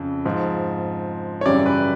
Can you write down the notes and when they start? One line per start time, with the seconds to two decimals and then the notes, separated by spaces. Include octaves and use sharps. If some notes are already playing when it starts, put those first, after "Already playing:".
Already playing: F2 C#3
0.25 G#2 F3
1.41 C#5
1.45 F#2 C#3 E3 G3 D5
1.66 B4